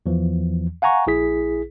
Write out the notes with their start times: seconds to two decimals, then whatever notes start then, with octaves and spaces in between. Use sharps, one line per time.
0.06 E2 E3 F3
0.82 F5 F#5 G#5 A#5 C#6
1.07 A#1 E4 G#4 B6